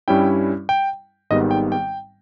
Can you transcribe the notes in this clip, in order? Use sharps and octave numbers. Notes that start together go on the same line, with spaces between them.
G2 G3 C#4 E4 G5
G5
G#1 G#2 D#3 G3 B3 D#5
G5
G5